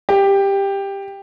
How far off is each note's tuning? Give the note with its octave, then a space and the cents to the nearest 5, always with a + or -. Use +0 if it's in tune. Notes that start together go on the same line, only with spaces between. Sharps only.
G4 +10